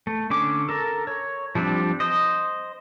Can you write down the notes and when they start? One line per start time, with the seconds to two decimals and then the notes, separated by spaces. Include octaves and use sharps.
0.07 A3
0.30 D3 C#4 D6
0.69 A4 A#4
1.07 C#5
1.55 F3 G3 C4 D4
2.00 C5 D#5